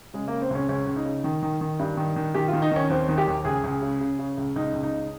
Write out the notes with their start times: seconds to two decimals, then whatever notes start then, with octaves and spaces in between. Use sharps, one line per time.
0.14 C#3 G#3
0.28 A#3
0.32 C#3
0.42 C4
0.50 C#2 C#4
0.69 C#2 C#4
0.87 C#2
0.96 D#4
1.05 C#3
1.24 D#3
1.43 D#3
1.61 D#3
1.79 G2
1.97 D#3
2.16 D#3
2.34 D#3 G4
2.48 F4
2.53 D#3
2.62 D#4
2.72 D#3 C#4
2.90 D#2 C4
3.09 D#3
3.18 G4
3.27 D#2
3.45 C#2 G#4
3.64 C#2
3.82 C#3
4.00 C#3
4.19 C#3
4.37 C#2
4.56 C#2 D#4
4.73 C#2
4.83 D#4
4.92 C#3